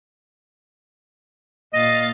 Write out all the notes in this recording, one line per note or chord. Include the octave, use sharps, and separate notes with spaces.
A#2 D#5 F5 A6